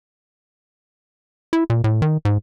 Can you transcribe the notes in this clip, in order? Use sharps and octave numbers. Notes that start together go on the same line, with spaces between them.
E4
A#2
A2
D#3
G#2